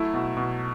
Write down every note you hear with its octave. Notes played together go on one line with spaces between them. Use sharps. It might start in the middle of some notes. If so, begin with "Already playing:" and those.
Already playing: F#3 A3 E4
B2
B2